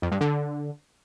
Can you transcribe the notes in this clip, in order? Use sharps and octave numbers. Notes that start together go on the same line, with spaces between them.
F2
G2
D3